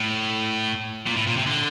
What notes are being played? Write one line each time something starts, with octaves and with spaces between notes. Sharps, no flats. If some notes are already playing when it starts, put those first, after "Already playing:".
Already playing: A2
A#2
A2
A#2
C3
D3